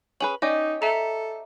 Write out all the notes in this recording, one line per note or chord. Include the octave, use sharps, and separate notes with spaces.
C#4 G#4 B4 F#7
C#4 D#4 G4 D5 D#5
A4 E5 A#5